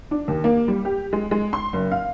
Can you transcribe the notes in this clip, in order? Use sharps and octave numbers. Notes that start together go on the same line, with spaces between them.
D4
D#2
A#3
G3
G4
G#3
G#3
C6
F#1
F5